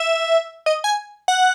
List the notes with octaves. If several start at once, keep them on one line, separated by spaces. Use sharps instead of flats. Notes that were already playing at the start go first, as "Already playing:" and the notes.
Already playing: E5
D#5
G#5
F#5